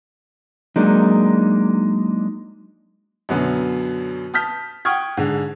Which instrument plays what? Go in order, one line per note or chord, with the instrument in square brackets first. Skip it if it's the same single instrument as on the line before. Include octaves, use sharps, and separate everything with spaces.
[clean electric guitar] F#3 G#3 A#3 D4 D#4
[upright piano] F#2 B2 D3 F#3 B3
A5 D#6 F6 G6 B6
F#5 G5 C#6 D#6 F6 G#6
G#2 D3